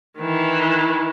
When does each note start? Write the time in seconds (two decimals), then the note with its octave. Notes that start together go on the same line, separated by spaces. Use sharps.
0.18 D#3 E3